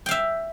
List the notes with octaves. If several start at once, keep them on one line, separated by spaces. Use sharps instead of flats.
E5 F5 G5